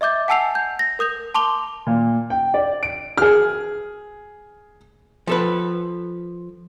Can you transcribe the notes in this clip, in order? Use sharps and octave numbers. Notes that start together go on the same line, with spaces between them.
D#5 E5 D6 G6 A6
F#5 G#5 A5 E6 C7 F7
G6
A#6
A#4 D#6 G6 F7
A5 C6 D6 F7 G7
A#2
G5
D5
D7
G#4 F6
F3 A4 B4